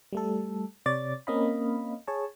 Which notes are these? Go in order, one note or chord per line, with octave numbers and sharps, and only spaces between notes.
G3 A3 A4
C3 C#5 D5 A6
A#3 C4 C#4 D#5 F5 B5
G#4 C#5 A5